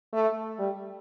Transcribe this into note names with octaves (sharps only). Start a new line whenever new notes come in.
A3
G3